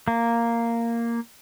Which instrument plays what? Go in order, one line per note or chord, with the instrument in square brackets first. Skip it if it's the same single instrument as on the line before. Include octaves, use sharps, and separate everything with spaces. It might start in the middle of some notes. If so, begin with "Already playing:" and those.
[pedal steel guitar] A#3